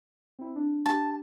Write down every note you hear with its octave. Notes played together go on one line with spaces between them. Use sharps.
C4 E4
D4
D4 G4 A5